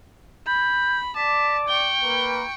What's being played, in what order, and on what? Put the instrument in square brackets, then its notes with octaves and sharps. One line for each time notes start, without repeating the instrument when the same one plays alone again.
[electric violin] B5 [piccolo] G6
[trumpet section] D5 D6 [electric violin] A5 [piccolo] B6
[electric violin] G5 C#6 [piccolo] G7
[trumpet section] A#3 B4